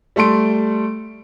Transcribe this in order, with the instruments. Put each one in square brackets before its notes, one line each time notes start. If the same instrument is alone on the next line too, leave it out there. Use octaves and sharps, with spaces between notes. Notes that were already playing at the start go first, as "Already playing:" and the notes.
[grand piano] G3 A3 A4 C6 D7